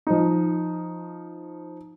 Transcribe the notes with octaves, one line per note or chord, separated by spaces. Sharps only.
F3 D#4